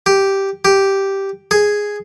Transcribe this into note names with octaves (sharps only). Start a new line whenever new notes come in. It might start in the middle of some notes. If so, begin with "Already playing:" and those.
G4
G4
G#4